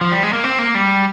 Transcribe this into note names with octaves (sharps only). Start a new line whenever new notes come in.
F3
G3
G#3
A#3
C4
A#3
G3